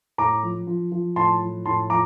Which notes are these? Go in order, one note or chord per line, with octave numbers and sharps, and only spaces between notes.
A2 A#5 D6
F3
F3
F3
A2 A5 C6
F3
A2 A5 C6
F3 A#5 D6